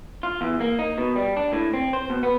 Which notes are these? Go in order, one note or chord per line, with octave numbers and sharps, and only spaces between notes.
F4
E2
A#3
D#4
B2
G3
D4
A2
C4
C5
B2
B3